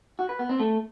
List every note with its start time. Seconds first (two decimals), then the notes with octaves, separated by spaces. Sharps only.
0.19 F#4
0.29 B4
0.39 B3
0.49 C4
0.60 A3